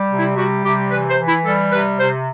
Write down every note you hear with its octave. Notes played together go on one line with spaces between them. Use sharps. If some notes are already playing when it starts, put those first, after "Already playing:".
Already playing: G3
C3
E4
G3 F#4
C3 G4
E3 B4
C5
E3
E4
G3 A4
C3 B4
C3 C5